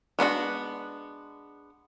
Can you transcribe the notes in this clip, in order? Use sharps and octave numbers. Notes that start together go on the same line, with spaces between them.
G#3 B3 D4 F#4